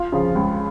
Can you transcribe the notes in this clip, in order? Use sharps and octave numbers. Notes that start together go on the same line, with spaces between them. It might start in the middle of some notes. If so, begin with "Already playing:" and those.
Already playing: F4
C#3 F3
C#2